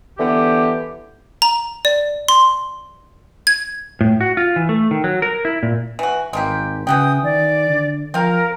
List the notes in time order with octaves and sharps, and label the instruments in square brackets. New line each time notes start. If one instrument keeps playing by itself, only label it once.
[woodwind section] D3 E3 B3 G4
[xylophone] A#5
D5
C6
G#6
[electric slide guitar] A2
F#4
F4
E3
A3
D#3
F#3
A#4
E4
A#2
[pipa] E3 F#4
[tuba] G#1 [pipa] G#3 A#3 G4
[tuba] C#3 [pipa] E3 F#4 G5 [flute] D#6
[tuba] D#3 [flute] D5
[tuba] D3
[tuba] F3 [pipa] C4 F5 [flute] A#4